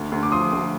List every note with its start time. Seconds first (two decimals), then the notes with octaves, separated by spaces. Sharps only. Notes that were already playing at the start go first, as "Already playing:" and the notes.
Already playing: D2
0.12 D2
0.23 D6
0.32 F3 C6 D#6
0.53 D2